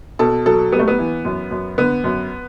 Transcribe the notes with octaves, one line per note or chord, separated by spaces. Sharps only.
B2 A4
F#3 A4
G3 B3
A3
B3
E3
F#2
F#2
D3 B3
F#2